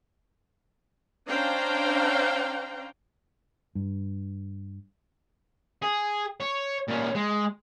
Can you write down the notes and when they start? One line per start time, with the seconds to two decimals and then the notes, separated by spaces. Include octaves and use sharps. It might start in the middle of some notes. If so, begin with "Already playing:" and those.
1.28 C#4 D4 C5 F5 G5 A#5
3.75 G2
5.82 G#4
6.40 C#5
6.88 A#2 C#4
7.15 G#3